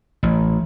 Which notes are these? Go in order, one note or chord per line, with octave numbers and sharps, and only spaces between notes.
A1